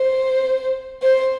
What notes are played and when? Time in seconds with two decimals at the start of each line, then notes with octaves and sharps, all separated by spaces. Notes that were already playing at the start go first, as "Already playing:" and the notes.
Already playing: C5
1.02 C5